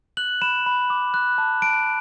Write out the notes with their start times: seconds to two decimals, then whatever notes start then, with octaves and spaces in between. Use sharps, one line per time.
0.17 F#6 F#7
0.42 B5 E7
0.66 B5
0.90 D6
1.14 F#6
1.38 A5
1.62 A5 D7